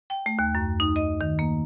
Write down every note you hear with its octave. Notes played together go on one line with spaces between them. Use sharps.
G5
A3
D#2
F#2
D#4
D#5
D#3
A#3